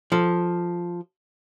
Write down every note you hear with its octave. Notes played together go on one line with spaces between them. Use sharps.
F3 A4